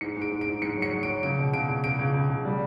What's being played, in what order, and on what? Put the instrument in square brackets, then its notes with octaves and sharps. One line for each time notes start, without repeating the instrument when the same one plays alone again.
[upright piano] G#2 C#7
G#2
D7
G#2
D7
G#2
G#2 C#7
F#3
C#7
F#3
D7
F#3
C#2 D7
B2
C#2 D7
C#2
C#2 D7
C#2
C#2
C#2
G3